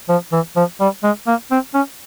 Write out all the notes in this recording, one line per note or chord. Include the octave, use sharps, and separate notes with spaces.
F3
E3
F3
G3
G#3
A#3
C4
C#4